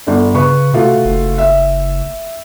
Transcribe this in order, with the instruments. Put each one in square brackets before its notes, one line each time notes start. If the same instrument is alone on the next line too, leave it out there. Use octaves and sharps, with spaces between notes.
[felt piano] G1 D3 D5
[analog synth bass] C#3 [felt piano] B4 C#6
[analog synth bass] C3 [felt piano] A3 F4 F#4
[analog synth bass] F#1
[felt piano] E5